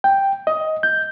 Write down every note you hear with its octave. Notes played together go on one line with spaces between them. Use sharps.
G5
D#5
G6